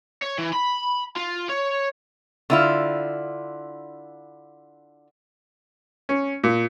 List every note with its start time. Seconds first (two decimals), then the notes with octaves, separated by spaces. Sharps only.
0.22 C#5
0.38 E3
0.53 B5
1.16 F4
1.49 C#5
2.50 D3 E4 F4
6.09 C#4
6.44 A#2